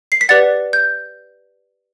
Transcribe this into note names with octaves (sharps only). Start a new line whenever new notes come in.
C7
B6
G4 B4 D5 F#5 A6
G6